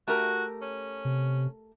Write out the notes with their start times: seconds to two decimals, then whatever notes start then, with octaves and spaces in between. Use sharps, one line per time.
0.08 A3 F#4 G4 A#4
0.62 C#4
1.05 C3